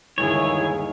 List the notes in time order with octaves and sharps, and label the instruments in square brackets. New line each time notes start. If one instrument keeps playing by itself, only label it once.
[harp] G1 D#2 G#3 [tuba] D#3 [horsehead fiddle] E4 G#4 [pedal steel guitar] C#5